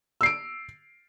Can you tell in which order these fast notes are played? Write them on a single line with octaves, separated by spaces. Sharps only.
E6 C7 D7